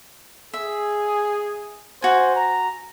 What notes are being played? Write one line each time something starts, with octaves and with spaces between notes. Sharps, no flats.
G#4 E5
F#4 C5 G#5
A#5